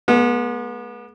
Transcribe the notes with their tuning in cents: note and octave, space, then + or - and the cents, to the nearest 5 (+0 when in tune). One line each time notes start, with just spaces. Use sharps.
G#3 +30 B3 -35